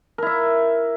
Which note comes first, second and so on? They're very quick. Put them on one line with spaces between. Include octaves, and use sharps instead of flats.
A#4 E4 E5